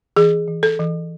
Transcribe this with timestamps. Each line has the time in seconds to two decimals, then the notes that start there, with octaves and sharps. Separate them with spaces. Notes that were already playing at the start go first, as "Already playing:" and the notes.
0.16 E3 G#4
0.48 E3
0.63 A4
0.79 E3